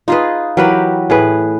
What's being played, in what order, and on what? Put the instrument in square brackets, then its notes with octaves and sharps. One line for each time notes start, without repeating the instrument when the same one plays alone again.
[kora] D#4 B4 [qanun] F4 G#4 D#5
[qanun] E3 G4 [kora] F#3 A#4 B4
[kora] A2 G#4 B4